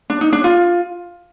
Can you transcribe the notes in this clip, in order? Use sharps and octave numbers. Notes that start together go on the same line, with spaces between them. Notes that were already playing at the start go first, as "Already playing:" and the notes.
D4
D#4
D4
F4